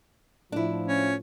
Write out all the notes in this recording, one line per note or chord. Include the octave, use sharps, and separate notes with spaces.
A2 F3 D4 E4
C#4